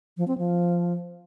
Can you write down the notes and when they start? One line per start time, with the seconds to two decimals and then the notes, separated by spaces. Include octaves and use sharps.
0.17 F3
0.28 C4
0.38 F3